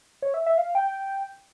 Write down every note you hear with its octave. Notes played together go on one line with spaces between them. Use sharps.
C#5
E5
E5
F5
G5